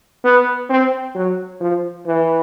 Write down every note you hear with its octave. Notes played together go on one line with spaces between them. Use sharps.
B3
C4
F#3
F3
E3